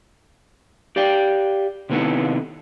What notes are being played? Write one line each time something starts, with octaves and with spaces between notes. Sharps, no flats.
G4 D5 F5 G5
C3 D#3 B3 C4 E4 A4